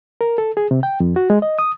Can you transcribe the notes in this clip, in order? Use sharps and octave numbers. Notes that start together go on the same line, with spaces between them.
A#4
A4
G#4
C3
G5
F2
F#4
G#3
D#5
D#6